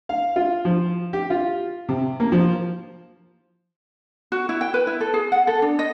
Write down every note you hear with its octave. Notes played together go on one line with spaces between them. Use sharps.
F5
F4
F3
G4
F4
C3
A#3
F3
F#4
E4
G5
B4
E4
A4
G#4
F#5
A4
D4
D#5